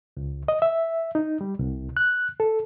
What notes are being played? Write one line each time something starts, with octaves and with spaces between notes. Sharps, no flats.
C#2
D#5
E5
D#4
G3
C2
F#6
A4